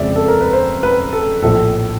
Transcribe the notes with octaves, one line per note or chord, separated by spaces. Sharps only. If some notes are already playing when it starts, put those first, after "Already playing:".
Already playing: F2 C#3 F3 G#3 D5 E5
A4
A#4
B4
C5
B4
A4
A#1 A2 F3 A4